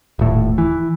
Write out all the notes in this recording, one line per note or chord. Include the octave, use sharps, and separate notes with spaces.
D#1 A2
E3